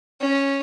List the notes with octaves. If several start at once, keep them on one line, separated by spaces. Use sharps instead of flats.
C#4